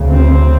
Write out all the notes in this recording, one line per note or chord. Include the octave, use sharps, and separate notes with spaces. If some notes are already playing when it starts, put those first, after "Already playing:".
Already playing: D2 C#3
C4